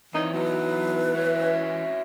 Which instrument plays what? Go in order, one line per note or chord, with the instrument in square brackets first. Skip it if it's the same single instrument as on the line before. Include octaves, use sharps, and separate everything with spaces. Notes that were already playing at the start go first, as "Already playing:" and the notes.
[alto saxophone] E3 [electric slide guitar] C4 C#5 D5 [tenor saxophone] D#4
[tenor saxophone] F#3 [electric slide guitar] B3 D#4 [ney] B4
[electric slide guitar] F#4 C#5 E5
[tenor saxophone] C#4